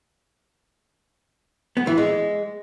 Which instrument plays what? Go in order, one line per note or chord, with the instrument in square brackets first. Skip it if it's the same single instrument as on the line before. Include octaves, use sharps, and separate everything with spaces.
[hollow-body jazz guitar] B3
E3
G#3